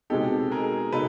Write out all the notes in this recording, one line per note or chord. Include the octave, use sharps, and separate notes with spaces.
B2 G#3 C4 D#4 G4 A4
G#4 A#4
B2 D#4 A4 B4